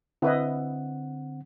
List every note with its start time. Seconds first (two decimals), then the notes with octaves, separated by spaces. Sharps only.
0.22 D3 C4 E4 B4 D#5 F#5